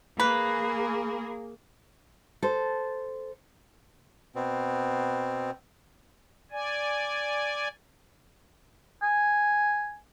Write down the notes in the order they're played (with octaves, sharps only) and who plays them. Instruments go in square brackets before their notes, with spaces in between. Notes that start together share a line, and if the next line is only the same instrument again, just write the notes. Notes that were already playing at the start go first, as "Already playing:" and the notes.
[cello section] A#3 G#4 [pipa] B4
[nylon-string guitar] A4 C5
[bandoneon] B2 B3 C4
[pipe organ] D5 G#5
[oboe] G#5